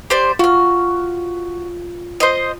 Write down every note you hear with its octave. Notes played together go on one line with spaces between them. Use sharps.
G4 C5 D5
F4 F#4 F6
C5 D#5